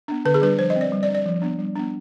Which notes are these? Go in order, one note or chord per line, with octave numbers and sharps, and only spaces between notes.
B3 D4
D3 B4
G#4
G3 D4 B4
F3 C5
D#5
C4
D5
G3
D5
D4
D5
F3
B3 D4
G3
B3 D4